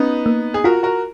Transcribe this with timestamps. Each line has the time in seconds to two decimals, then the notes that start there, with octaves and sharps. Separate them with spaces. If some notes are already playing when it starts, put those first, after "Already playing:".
Already playing: B3 C#4 D#4
0.26 A#3
0.54 G#4
0.64 F4 F#4 A#4
0.83 F#4 A#4